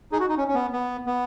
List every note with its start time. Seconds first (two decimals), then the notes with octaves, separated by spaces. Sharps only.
0.12 D#4 G#4
0.20 F#4
0.29 D#4
0.37 C#4
0.48 C#4
0.54 B3
0.73 B3
1.06 B3